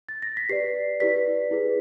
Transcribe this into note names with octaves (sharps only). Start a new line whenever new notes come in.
A6
A#6
B6
G4 B4 D5 C7
E4 G4 B4 D5 B6
E4 G#4 B4